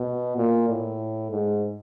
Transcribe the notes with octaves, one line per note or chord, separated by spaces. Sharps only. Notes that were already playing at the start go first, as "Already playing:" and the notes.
Already playing: B2
A#2
A2
G#2